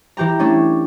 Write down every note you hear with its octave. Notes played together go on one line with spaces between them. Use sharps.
E3 G4 G5 A#5
A3 C#4 D4